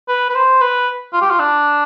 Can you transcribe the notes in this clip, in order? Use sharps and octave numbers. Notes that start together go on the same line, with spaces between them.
B4
B4
C5
B4
F4
G4
F4
D4